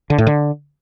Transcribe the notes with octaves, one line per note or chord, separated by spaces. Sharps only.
D3
A2
D3